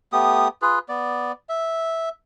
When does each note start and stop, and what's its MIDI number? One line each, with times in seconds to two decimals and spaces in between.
0.12 0.48 57
0.12 0.48 59
0.12 0.48 67
0.12 0.48 87
0.62 0.79 65
0.62 0.79 68
0.62 0.79 71
0.89 1.32 59
0.89 1.32 74
1.49 2.09 76